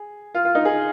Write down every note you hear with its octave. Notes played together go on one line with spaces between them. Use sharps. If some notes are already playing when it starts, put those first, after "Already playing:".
Already playing: G#4
F4
F4
D#4
G#4